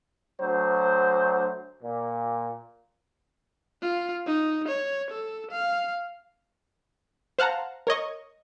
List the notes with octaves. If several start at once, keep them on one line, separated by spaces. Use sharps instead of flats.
D2 F#3 C5
A#2
F4
D#4
C#5
A4
F5
C5 F5 F#5 A5 A#5
A#4 C#5 D#5 C#6